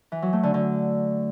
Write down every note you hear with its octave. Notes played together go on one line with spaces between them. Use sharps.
E3
F#3
A3
D3
D3